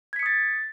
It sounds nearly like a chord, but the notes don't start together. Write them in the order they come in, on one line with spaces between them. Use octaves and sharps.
G#6 B6 C#7 D#6 A6